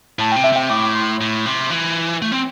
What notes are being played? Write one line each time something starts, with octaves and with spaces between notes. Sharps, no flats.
A2 A5
C3 G5
E5
C3 G5
A2 D6
C6
A2
C3
E3
A3
C4